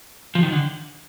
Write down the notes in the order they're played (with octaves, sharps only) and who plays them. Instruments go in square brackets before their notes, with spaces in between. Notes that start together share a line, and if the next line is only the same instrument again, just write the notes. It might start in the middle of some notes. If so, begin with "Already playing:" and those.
[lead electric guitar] F3
D#3
D3